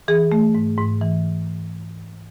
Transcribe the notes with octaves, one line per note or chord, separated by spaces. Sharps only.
E3 G#4
A3
G#2
G#2
E3